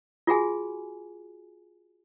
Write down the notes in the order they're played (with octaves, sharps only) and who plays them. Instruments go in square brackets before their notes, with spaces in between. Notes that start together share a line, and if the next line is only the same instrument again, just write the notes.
[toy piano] F4 F#4 G#4 G#5